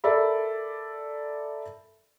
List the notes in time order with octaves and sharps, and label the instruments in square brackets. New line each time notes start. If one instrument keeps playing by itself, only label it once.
[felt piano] A4 A#4 D5 E5 B5